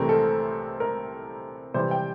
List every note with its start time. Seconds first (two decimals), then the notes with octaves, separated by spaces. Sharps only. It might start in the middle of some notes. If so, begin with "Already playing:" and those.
Already playing: C2 C3 E3 A3 C4 A#4
0.09 A4
0.80 A#4
1.74 C3 E3 G3 C5
1.91 G5